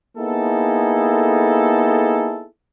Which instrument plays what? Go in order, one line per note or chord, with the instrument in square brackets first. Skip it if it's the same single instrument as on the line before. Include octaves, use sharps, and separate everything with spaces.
[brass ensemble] A#3 B3 D#4 E4 G#4 A4